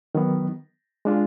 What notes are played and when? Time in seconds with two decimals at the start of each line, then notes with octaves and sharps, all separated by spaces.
0.15 D#3 F#3 B3
1.05 G#3 D4 F4